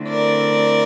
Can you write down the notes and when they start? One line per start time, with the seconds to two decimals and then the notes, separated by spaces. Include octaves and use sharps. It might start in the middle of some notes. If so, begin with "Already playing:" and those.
Already playing: D3 A3 C4 E4
0.09 A#4 D5